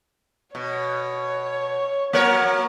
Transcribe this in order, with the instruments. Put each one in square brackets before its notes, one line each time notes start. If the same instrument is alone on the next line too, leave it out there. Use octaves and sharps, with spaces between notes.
[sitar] B2 [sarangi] C#5
[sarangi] F#3 [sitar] A#3 A#4 C#5